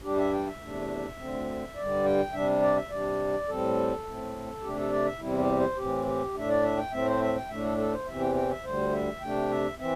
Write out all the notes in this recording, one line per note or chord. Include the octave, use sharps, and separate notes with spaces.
G2 G3 D4 G4
E5
G5
E5
E2 C3 A3 D4
D2 D3 C4
G2 D3 G3 D5
G5
C3 G3 D4 E5
D5
E5
C3 G3 D4 D5
A2 G3 C4 A4
A2 A3 C4
C3 A3 D4 G4
A4
D5
E5
E2 C3 G3 C4 E4
G4
C5
A2 E3 C4 G4
G4
A2 A3 D4 E5
D5
E5
G5
A2 A3 C4 E5
C5
E5
G5
A2 A3 D4 E5
A4
A4
C5
E2 C3 E3 C4 E5
G5
G5
E5
D2 D3 G3 C5
E5
C3 A3 D4 G5
E5
E3 C4 E5